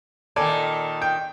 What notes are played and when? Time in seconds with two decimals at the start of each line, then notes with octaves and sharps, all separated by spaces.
0.36 A#2 D#3 A4 D5 G#5
1.02 G5